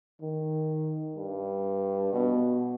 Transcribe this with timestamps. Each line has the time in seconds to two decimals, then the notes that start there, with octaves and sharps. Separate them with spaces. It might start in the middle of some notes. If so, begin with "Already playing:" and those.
0.21 D#3
1.16 G2
2.13 B2